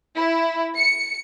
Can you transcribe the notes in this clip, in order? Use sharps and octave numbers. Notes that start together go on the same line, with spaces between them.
E4
C#7